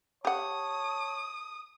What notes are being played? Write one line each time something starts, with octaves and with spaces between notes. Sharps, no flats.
G4 C#5 F#5 A5 D#6